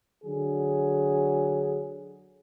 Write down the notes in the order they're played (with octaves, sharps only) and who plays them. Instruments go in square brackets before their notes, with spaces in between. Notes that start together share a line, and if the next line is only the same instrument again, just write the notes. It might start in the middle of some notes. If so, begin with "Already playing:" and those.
[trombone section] D3 F#3 G#4